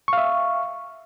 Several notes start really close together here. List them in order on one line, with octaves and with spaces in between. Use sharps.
C#6 F5 E5